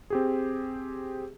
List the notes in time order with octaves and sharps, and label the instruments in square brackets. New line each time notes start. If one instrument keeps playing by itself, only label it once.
[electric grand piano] C4 G4 G#4